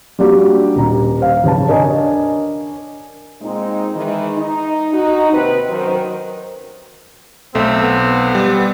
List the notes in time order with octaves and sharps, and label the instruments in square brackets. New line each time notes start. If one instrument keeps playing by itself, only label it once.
[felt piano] G3 A#3 D4 F#4 G4
D#1 A#5
C5 F5
D#2 C#3 B4 A5
D4 A#4 C#5 D#5 G#5
[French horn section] A#2 G#3 C4 D#4
D#3 E3 G#3
D#4
D#4 F#4
D#2 C3 C4 B4
F#2 D#3 C5
[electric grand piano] B1 [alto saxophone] A3 [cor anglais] C4
[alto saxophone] B3
[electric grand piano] G3